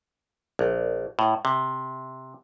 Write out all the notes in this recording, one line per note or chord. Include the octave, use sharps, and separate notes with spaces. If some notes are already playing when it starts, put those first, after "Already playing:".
A#1
A2
C3